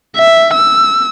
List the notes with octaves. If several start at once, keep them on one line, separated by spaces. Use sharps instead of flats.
E5
E6